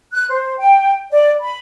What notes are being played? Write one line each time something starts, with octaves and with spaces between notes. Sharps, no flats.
F#6
C5
G5
D5
B5